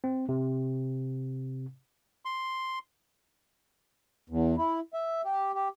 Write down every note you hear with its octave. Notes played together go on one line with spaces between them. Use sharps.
C4
C3
C6
E2
E4
E5
G4
G4